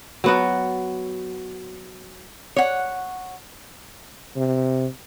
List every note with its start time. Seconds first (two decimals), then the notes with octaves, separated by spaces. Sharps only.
0.24 F#3 B3 F#4
2.56 C#5 F#5
4.36 C3